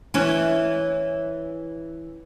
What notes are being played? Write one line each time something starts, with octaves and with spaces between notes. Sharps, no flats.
E3 C#4